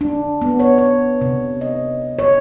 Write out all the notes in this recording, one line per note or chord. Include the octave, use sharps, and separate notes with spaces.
D4
B3
C#5
C#5
C3
D#5
C#5